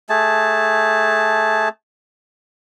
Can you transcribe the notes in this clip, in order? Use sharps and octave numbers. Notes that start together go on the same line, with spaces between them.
A3 G#4 A5